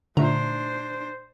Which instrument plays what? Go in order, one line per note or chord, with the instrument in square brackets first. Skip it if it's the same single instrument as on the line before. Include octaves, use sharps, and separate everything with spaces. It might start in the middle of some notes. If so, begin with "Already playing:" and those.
[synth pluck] A#2 A3 A#5 [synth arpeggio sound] D3 [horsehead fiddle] D4 C5